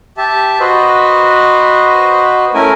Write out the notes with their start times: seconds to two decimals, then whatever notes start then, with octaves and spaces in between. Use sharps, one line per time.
0.17 G4 E5 A5
0.60 F#4 B4 C5 D#5
2.54 A3 C#4 E4 A#4 G#5